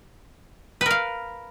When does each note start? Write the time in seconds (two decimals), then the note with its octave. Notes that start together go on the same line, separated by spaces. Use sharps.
0.81 B4
0.86 A#4
0.91 F5